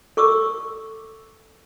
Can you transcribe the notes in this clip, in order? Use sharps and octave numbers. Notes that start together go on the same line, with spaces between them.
A4 C#6 D6 E6